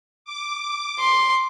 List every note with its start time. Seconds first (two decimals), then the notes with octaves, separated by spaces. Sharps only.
0.25 D6
1.00 C6